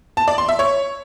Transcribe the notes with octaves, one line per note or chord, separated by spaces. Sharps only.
A5
D5
C6
E5
C#5